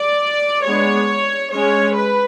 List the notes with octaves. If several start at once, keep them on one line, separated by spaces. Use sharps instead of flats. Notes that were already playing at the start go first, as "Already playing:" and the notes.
Already playing: D5
G#3 B3 D4 C#5
G#3 C#4 C#5
B4